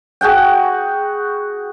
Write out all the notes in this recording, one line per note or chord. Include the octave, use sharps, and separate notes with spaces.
F#4 G#4 F#5 G5